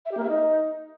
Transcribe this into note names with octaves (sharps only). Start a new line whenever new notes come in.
E5
G4
A#3
E5
D#4